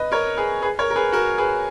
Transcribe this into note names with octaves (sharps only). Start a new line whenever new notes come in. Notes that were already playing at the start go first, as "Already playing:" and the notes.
Already playing: B4 D#5
A#4 C#5
G#4 B4
G#4 B4
A#4 C#5
A#4
G#4 B4
F#4 A#4
G#4 B4